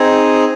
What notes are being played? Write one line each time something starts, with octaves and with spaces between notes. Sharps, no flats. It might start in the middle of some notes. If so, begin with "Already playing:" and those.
Already playing: C4 D#4 G#4